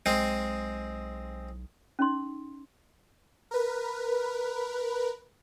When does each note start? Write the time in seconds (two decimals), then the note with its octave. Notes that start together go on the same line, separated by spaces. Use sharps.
0.06 B1 G#3 C4
1.99 C#4 D#4 C6
3.51 A#4 B4